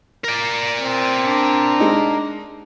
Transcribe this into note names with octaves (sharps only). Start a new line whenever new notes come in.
A#4 D5
C4
D4
G#3 D#4